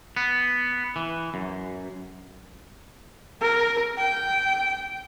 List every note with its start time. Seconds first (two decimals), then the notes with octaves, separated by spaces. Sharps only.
0.17 B3
0.96 E3
1.34 F#2
3.41 A#4
3.97 G5